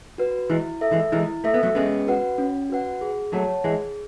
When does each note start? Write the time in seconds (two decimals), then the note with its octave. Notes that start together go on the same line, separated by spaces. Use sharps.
0.18 F#4 B4
0.50 E3 G#3 E4
0.81 A4 E5
0.92 E3 G#3
1.12 E3 G#3 E4
1.44 A3 A4 E5
1.54 B3
1.63 F#3 A3
1.75 G#3 B3 C#4
2.07 F#4 B4 F#5
2.38 C#4
2.70 F#4 B4 F#5
3.01 G#4
3.33 F#3 A3 C#5 F#5 A5
3.64 E3 G#3 G#4